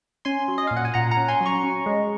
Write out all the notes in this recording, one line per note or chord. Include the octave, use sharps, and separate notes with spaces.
C#4 G#5 C6
F#3
D#5
A#2 F5
F#5
G#5
A#2 F#5 A#5
F#5 A#5
C#4
G#5 C6
F#3
A#5 C#6
C#4
G#3